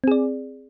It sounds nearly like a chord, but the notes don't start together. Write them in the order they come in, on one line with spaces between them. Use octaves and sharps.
C4 G#4 D5